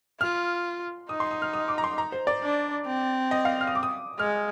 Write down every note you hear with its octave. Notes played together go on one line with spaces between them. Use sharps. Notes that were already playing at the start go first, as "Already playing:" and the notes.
F4 F6
D#4 D#6
C6
D#6
F6
D#6
D6
A#5
C6
A#5
C5
D5
D4
C4
D#5
F5
F6
D#6
D6
D#6
G#3 F6